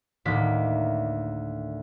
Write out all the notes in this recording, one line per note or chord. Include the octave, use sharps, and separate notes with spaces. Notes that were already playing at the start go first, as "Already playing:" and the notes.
D2 A2 D#3 A#3 B6